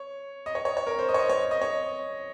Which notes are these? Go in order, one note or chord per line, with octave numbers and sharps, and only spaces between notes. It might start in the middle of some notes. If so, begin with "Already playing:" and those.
Already playing: C#5
D#5
C#5
C#5
C#5
A#4
C5
D#5
C#5
D#5
C#5
D#5
C#5